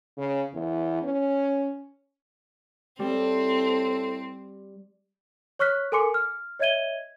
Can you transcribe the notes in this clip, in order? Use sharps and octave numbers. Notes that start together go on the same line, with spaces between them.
C#3
E2
C#4
A2 G3 C4 A4
C#5 C#6 F6 F#6 B6
A4 A#4 G#5 C6 D6 C#7
F6
C#5 D#5 E5 G#6 D#7 G7